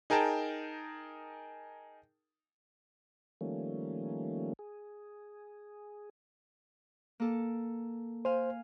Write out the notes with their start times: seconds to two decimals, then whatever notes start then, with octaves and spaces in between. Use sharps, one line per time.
0.10 D#4 G#4 A#4 G5 A5
3.41 D#3 F3 G3 A3 A#3 C#4
4.59 G#4
7.20 A#3 A4
8.25 C5 F5 G#5